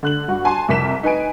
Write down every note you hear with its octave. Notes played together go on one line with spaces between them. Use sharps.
D3 F#6 F#7
G2 F#4
G#5 A5 C6
C2 F2 A#4 B6 E7
D#4 B4 G#5 D7